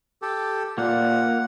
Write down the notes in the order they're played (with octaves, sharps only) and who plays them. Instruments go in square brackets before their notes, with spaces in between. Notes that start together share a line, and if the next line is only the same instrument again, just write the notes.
[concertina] G4 A4
[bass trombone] A#2 [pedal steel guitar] A#3 [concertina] F#5